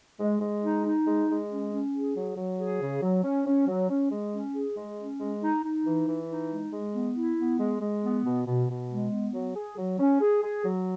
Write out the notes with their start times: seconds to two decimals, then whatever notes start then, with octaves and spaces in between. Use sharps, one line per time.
0.20 G#3
0.41 G#3
0.63 D#4
0.85 D#4
1.07 G#3
1.29 G#3
1.50 C#4
1.72 C#4
1.93 G#4
2.16 F#3
2.37 F#3
2.59 G#4
2.81 C#3
3.02 F#3
3.24 C#4
3.46 C#4
3.68 F#3
3.90 C#4
4.12 G#3
4.33 C#4
4.55 G#4
4.77 G#3
4.99 C#4
5.20 G#3
5.42 D#4
5.64 D#4
5.86 E3
6.07 E3
6.30 D#4
6.51 G#3
6.73 G#3
6.95 B3
7.16 E4
7.38 B3
7.60 G#3
7.82 G#3
8.03 B3
8.25 B2
8.47 B2
8.69 B2
8.91 G#3
9.12 B3
9.34 F#3
9.56 G#4
9.78 F#3
10.00 C#4
10.21 G#4
10.43 G#4
10.65 F#3